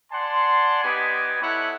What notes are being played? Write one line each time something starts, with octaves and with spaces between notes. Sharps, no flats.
D5 F#5 G#5 A5 C6
B3 D#4 G4 G#5 B5 D6
E4 A4 C#5 F#5